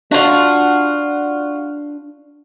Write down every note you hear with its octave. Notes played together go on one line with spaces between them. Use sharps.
D4 F4 F#4